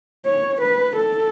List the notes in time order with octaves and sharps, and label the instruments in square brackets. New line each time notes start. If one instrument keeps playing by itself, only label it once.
[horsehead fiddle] C#5
B4
A4